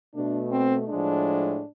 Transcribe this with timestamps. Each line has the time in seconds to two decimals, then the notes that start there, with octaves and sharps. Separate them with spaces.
0.14 B2 A3 D4
0.51 C4
0.88 A2 F3 G#3 D4